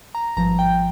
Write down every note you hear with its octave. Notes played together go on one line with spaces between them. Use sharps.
A#5
G#1 G2 F3 A#5
G5